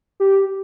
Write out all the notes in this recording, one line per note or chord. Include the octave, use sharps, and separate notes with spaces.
G4